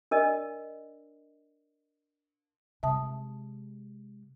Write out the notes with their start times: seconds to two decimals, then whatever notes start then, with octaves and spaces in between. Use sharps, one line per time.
0.11 D4 A#4 D5 D#5
2.83 C3 G#3 E5 A5 D#6